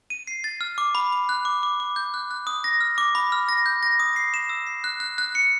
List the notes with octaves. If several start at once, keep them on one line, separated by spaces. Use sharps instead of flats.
D#7
C7
A6
F6
D6
B5
B5
F#6
D6
D6
D6
G6
F#6
F#6
D#6
A#6
F6
D6
B5
F6
A#6
G6
A#6
D#6
C7
E7
E6
C7
F#6
F#6
F#6
C#7